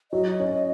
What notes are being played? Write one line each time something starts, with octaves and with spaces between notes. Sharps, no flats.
F#3 D#5
C#4